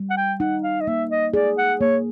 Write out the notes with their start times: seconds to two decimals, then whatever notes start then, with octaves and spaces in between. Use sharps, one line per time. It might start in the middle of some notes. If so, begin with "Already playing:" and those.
Already playing: G3
0.10 F#5
0.17 G5
0.40 D#4 F#5
0.63 F5
0.81 D#5
0.87 A#3 E5
1.10 D#5
1.34 G#4 D5
1.58 F#5
1.81 A#3 C#5